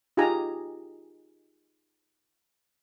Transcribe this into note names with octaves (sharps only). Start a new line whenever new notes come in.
D#4 F4 G4 G#4 G#5 A#5